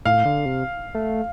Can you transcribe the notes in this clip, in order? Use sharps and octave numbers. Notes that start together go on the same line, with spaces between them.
A2 F5
D3
C3
A3